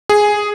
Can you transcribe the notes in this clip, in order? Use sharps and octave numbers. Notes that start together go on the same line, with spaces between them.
G#4